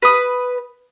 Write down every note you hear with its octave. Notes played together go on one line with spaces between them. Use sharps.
B4 D#6